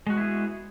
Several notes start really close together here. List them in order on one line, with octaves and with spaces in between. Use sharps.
G#3 F#4 B3 E4 G#4